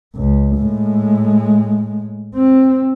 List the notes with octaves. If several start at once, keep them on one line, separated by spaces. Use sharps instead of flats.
C#2
A2 G#3
C4